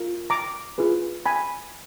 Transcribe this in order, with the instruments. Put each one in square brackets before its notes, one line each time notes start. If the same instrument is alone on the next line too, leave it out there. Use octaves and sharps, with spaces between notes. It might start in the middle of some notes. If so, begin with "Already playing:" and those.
Already playing: [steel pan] F4 A#4
A#5 D6
F4 G#4 B4
G#5 B5